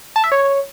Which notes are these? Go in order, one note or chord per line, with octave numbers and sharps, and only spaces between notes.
A5
E5
C#5